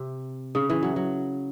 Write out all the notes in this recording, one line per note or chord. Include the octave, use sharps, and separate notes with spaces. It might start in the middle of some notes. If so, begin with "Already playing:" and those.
Already playing: C3
C#3
E3
F#3
F#3